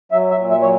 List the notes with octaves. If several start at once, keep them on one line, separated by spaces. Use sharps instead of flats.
F#3 E5
E5
A#2
E5
F#3 C#5